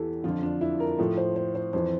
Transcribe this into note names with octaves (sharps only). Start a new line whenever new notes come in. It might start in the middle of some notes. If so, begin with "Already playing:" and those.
Already playing: E2 E3 G4 A4
F2 D3 F3 F4
D4
E4
A#4
A2 F3 A4
C5
C5
C5
F2 E3 C5